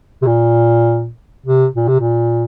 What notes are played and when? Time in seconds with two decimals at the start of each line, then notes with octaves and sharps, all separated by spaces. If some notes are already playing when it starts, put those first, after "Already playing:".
0.22 C3
0.27 A#2
1.46 C3
1.76 A#2
1.88 C3
2.00 A#2